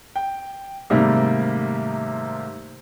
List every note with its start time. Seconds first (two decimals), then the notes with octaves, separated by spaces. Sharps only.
0.16 G5
0.90 G#2 C3 D#3 G3 A3 A#3